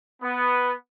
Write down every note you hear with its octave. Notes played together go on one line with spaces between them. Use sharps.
B3